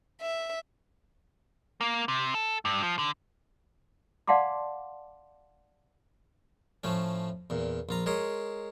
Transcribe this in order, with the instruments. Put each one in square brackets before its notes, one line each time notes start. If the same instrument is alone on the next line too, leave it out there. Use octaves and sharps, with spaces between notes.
[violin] E5
[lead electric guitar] A#3
C3
A4
G2
F3
D3
[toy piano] D5 F5 F#5 A5 C6 D6
[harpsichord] A2 F3 A3 C#4
E2 A#2
A#1 F4 A#5
G#3 A#4 C#5 C6 D#6